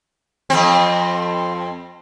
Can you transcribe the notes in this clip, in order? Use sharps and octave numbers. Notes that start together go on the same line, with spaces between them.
F2 C4